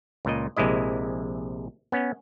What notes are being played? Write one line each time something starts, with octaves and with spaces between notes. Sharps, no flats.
C#2 A#2 D#5
A#1 C3 G#3 E4 D#5
B3 C#4